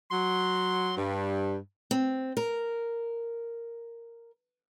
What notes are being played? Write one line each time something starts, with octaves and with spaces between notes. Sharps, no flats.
F#3 C6
G2
C4
A#4